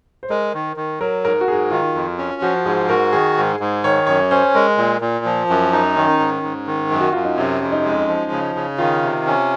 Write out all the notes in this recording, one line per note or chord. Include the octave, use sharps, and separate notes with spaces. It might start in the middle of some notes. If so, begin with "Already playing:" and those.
C5
G#3 A#4
D#3
D#3
F#3 A#4
G#2 A#4
F#4
G#2 G#4
D#3 F4
F2
C#4
F3 F#4
G#2 G#4
F#4 A#4
D#3 G#4
G#2
G#2
D#3 C#5
F#2 C#5
C#4 C5
G#3 A#4
A#2
A#2
F3
F#2
D#4
D#3 C#4
G#2
G#2
D#3
F#2
F#4
F#2 F4
D#4
C3 C#4
F2
D#4
G#3
F3
C#3
C#3
D#3 F4
C3
C#4